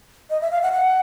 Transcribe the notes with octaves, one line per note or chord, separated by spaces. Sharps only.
D#5
E5
F5
F#5
F#5